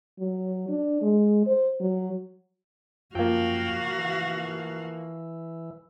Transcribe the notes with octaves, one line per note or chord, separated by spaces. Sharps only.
F#3
D4
G#3
C5
F#3
F#2 F3 A#3 F#4 F5 G5
E3